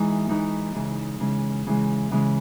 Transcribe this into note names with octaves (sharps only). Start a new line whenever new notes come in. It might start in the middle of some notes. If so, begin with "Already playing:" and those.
Already playing: E3 G#3 D#4
E3 G#3 D#4
C#3 E3 G#3
C#3 E3 G#3
C#3 E3 G#3
C#3 E3 G#3